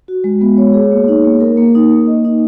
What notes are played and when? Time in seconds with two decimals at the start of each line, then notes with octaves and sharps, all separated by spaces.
0.08 F#4
0.24 G#3
0.41 B3
0.58 C#5
0.74 G#4
0.92 A#3
1.08 D#4
1.25 A#3
1.40 A#4
1.57 A#3
1.75 D#4
1.90 A#3
2.07 D#5
2.25 D#4